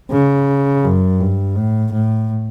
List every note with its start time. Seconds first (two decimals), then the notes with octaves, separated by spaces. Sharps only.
0.11 C#3
0.84 F#2
1.20 G2
1.57 A2
1.93 A2